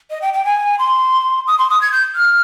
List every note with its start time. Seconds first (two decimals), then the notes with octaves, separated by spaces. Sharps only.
0.10 D#5
0.22 G5
0.33 G5
0.45 G#5
0.79 C6
1.47 D#6
1.58 C6
1.70 D#6
1.81 G#6
1.92 G6
2.15 F6